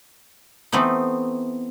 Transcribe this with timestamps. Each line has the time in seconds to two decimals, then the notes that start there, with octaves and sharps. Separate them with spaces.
0.72 E3 A3 B3 C4 D#4